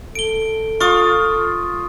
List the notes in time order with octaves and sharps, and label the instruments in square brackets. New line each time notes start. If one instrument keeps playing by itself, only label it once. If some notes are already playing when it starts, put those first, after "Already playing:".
[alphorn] A4 [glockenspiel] D7 G7
[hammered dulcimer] F4 [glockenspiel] C#6 D#6